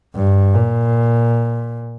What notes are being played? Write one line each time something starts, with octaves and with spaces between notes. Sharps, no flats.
G2
A#2